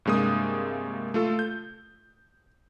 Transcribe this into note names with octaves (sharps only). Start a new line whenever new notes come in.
G2 C3 G#3 A#3 D#6
A3 F4 A4
G6